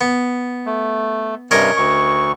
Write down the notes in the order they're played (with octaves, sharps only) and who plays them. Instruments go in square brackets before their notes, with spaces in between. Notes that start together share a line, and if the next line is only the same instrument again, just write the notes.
[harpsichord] B3
[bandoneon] A3
[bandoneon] G2 C3 G3 [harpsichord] C#4 A#4 D#5
[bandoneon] D2 C#6